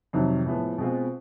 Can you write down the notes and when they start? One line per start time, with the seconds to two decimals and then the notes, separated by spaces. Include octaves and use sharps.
0.13 F2 C3 D#3 F#3
0.45 A2 F3 G#3 B3
0.78 B2 G#3 C4 F4